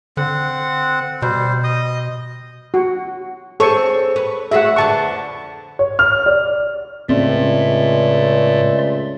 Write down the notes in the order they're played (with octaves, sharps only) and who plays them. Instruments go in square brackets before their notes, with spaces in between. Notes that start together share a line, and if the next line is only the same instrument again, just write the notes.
[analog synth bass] D3 [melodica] C4 F#5
[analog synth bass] B2 [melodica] G3 C5
[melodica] D#5 D#6
[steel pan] F#4
[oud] C4 G#4 C#5 [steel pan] A4 C#6
[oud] B4 C#5
[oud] A3 F#4 G#4 [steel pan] E5 F#5
[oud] F2 D3 B4 [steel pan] A5 C#6
[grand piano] C#5
F6
D5
[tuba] C#2 [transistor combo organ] A2 [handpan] C4 C#4 [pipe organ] D5 E5 C6